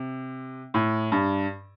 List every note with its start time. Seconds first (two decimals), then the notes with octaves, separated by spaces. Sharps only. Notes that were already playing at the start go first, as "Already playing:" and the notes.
Already playing: C3
0.74 A2
1.12 G2